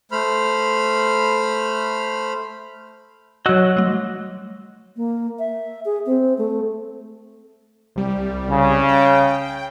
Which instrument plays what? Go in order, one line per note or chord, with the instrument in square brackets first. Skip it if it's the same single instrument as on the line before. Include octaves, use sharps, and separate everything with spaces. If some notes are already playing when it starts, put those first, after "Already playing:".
[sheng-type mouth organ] A3 C5 B5 F6
[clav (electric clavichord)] F#3 F#4 [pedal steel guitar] D#5 E6 F#6
[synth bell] G3 A3
[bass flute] A#3
E5
G#4
C4
A3
[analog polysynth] C2 G3
[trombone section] C#3
[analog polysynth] G5